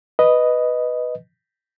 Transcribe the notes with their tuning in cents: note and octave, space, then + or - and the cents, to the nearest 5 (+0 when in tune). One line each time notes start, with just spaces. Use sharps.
B4 +0 D#5 +0